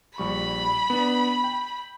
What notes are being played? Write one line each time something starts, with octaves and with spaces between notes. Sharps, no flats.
A#1 G3 B5 C#6
B3 D4
G5